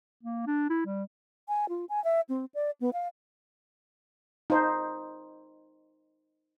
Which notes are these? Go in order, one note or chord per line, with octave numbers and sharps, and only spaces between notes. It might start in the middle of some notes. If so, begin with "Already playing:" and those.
A#3
D4
E4
G3
G#5
F4
G#5
E5
C4
D5
B3
F5
D#4 C5